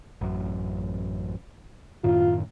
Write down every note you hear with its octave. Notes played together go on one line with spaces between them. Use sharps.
A1 F#2
F#2 A2 D#3 F4